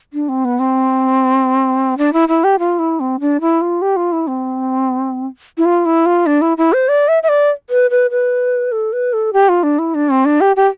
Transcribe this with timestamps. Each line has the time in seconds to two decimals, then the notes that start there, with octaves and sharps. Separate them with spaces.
0.13 D4
0.29 C4
0.45 B3
0.59 C4
1.98 D4
2.13 E4
2.28 E4
2.44 G4
2.59 F4
2.79 E4
3.00 C4
3.20 D4
3.41 E4
3.61 F4
3.82 G4
3.96 F4
4.12 E4
4.27 C4
5.58 E4
5.65 F4
5.86 E4
6.06 F4
6.26 D4
6.41 E4
6.58 E4
6.73 C5
6.88 D5
7.08 E5
7.23 E5
7.29 D5
7.70 B4
7.91 B4
8.11 B4
8.72 A4
8.93 B4
9.13 A4
9.33 G4
9.49 F4
9.63 D4
9.79 E4
9.95 D4
10.10 C4
10.25 D4
10.41 G4
10.56 G4